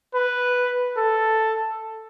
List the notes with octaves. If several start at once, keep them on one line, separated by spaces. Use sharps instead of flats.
B4
A4